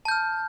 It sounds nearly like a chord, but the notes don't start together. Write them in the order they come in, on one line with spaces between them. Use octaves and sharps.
A5 G6 F6